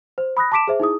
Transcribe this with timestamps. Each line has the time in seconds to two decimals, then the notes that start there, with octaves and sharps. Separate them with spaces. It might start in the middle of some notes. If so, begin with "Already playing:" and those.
0.18 C5
0.37 B5 D#6 F#6 A#6
0.52 A5 C6 D6 B6 D7 E7
0.68 G#4 C5 E5
0.80 D#4 E4 G#4 D#6